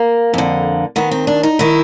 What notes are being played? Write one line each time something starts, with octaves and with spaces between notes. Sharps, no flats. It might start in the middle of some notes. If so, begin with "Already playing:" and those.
Already playing: A#3
F2 D3
D#2 D#3 B3
C4
D4
D#4
D#3 E4